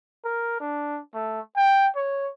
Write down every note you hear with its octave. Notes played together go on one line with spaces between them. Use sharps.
A#4
D4
A3
G5
C#5